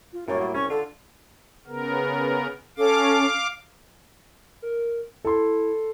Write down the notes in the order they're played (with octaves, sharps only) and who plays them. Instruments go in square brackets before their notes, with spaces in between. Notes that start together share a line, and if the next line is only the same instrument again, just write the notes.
[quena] F4
[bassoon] F#2 [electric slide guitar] A2 G3 A#3 [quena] C#5
[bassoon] F#3
[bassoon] C2 [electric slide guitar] C#4 [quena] C#6
[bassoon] D3 [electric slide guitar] F4 [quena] A4
[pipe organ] C#3 B3 A#4
[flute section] C#4 A4 [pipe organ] F5 D6
[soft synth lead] A#4
[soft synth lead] E4 [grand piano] A4 C6